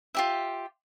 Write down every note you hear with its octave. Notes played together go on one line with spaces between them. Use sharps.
F4 G4 E5